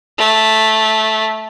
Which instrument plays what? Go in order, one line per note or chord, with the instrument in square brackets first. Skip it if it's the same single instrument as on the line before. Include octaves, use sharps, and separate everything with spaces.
[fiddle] A3